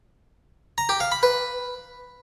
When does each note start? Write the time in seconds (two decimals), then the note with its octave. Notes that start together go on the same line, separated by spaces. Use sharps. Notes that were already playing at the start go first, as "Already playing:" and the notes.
0.78 A#5
0.89 G4
1.00 F5
1.12 B5
1.23 B4